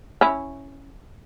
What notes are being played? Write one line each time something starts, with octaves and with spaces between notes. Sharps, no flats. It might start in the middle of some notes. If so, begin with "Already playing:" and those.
C#4 E4